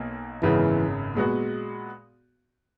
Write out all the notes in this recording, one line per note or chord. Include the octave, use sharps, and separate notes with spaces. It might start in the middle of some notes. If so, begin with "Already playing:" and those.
Already playing: B1 B2 A#3
G#1 F#2 C#3 E3 G#3 B3
A#2 G#3 B3 F#4